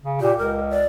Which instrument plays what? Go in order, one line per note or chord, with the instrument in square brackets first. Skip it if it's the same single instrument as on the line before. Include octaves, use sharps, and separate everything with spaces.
[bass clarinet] C#3
[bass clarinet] A#2 [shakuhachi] G4
[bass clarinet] C#2 [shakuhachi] A#4
[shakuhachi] D5